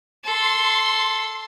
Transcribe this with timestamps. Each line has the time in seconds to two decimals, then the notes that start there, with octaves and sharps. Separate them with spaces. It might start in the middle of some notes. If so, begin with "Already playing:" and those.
0.24 A4 C6